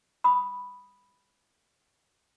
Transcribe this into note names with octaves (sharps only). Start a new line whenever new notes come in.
B5 D#6